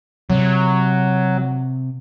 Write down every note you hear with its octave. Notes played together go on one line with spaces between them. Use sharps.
C3 F#3